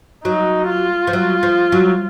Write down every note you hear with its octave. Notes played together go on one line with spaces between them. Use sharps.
F#3 D#4
F4
F3
F#3
F3
F#3